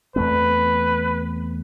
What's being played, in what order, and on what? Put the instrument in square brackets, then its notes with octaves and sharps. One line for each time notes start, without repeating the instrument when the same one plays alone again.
[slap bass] E2 A3 C4 [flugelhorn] B4